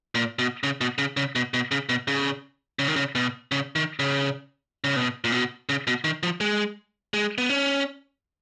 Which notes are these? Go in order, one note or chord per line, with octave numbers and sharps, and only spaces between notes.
A#2
B2
C#3
B2
C#3
C#3
B2
B2
C#3
B2
C#3
C#3
D#3
C#3
B2
C#3
D#3
C#3
C#3
B2
A#2
B2
C#3
B2
D#3
F3
G#3
G#3
B3
C#4